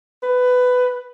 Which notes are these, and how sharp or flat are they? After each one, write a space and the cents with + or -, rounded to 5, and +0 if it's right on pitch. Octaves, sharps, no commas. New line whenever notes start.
B4 +15